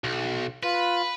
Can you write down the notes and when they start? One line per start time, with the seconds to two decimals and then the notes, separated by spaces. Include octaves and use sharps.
0.04 B1
0.63 F4 B4